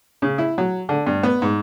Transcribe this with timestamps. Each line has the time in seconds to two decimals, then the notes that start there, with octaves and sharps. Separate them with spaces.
0.22 C#3
0.38 E4
0.58 F#3
0.89 D3
1.07 G2
1.23 B3
1.42 G#2